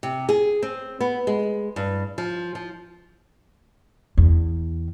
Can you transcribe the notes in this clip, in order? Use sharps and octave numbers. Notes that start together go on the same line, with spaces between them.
C3
G#4
C4
B3
G#3
G2
F3
F3
E2